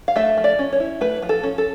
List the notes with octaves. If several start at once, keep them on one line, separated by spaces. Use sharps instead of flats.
F5
A3 E5
F3
D5
C#4
C#5
E4
A3 B4
F3
A4
C#4
A4